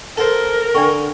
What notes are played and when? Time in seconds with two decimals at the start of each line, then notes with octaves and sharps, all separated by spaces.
0.17 A4 A#4 C5
0.75 D3 D4 G5 C#6